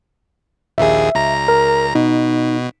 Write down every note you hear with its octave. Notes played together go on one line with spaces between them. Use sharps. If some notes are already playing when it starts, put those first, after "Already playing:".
A#1 D#2 G#4 E5
C#2 A#5
A#4
B2 D#4